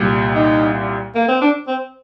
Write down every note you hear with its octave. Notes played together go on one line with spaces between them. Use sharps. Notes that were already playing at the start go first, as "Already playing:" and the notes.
Already playing: C2 A#2 G3
D#4
A#3
C4
D4
C4